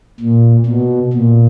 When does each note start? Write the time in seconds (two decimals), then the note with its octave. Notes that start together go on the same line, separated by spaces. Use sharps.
0.20 A#2
0.66 B2
1.13 A#2